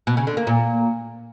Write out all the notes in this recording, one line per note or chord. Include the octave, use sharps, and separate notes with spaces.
B2
C#3
D3
A#3
A#2